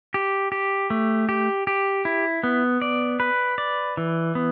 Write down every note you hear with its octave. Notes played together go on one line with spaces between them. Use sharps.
G4
G4
A3
G4
G4
E4
B3
D5
B4
D5
E3
B3